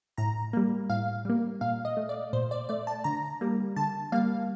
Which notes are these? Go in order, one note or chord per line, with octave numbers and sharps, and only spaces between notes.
A2 A#5
G3 A#3
A2 F5
G3 A#3
A#2 F5
D#5
A3
D5
A#2 C5
D5
A3 D5
A5
D3 A#5
G3 A#3
D3 A5
G3 A#3 F5